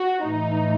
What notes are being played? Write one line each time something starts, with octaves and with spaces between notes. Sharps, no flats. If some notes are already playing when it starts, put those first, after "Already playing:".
Already playing: F#4
A2 E3 D#4